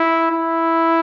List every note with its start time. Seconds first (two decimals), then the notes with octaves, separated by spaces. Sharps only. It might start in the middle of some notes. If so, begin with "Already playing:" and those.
Already playing: E4
0.32 E4